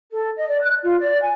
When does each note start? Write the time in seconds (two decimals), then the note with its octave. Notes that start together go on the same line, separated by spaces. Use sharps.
0.11 A4
0.35 D#5
0.48 D5
0.61 F#6
0.82 F4
1.01 D5
1.21 G#5